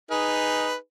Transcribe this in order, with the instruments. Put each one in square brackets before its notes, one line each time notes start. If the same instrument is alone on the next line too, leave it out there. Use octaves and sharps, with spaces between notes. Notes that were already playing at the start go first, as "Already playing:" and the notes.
[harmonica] D#4 G#4 B4